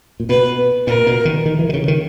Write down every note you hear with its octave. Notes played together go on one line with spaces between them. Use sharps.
A#2
B2 B4
A#2 A#4
B2
D#3
D#3
E3
D#3
C#3
D#3